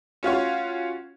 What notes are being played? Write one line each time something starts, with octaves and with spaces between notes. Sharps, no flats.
C#4 F4 F#4 C#5